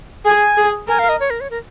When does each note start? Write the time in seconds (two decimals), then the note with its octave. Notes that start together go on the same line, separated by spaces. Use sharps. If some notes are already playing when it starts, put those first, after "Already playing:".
0.25 G#4 G#5
0.57 G#4
0.88 A#4 G#5
0.99 F5
1.09 D#5
1.20 C#5
1.30 A#4
1.41 C#5
1.51 A#4